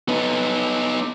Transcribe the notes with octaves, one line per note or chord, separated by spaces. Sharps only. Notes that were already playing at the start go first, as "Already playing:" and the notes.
B3 D#4